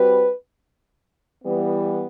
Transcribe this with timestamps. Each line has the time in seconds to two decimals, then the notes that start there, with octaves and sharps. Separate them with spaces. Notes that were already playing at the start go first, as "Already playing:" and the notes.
Already playing: G3 C4 F#4 B4
1.44 E3 G3 B3